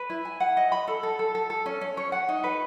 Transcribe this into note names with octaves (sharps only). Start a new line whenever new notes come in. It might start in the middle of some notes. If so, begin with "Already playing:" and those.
Already playing: B4
E4
G#5
F#5
D#5
B5
A4
A4
A4
A4
A4
C#4
C#4
C#5
F#5
D#4
B4